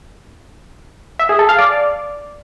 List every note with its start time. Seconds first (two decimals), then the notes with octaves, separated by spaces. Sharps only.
1.19 E5
1.29 G#4
1.39 A4
1.49 F5
1.59 D5